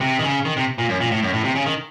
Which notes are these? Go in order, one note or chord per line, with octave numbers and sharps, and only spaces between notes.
C3
D#3
C#3
D#3
C3
A#2
F#2
A#2
A2
F#2
A2
C3
C#3
D#3